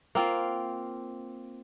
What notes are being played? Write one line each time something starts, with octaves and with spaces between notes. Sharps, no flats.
A#3 C4 F4